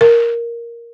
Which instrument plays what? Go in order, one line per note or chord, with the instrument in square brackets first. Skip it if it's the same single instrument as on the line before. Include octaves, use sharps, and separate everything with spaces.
[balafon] A#4